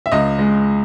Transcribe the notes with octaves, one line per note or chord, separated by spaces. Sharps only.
E5
C#2 D#5
G#3